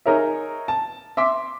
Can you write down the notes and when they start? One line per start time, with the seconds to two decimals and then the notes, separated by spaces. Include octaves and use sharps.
0.06 D#4 G#4 A#4 C#5 E5
0.68 A5
1.17 E5 C6 D6 B6